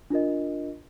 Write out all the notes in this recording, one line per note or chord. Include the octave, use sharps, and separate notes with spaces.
D4 F4 A#4 D#5